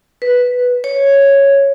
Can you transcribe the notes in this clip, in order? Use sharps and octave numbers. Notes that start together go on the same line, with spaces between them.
B4
C#5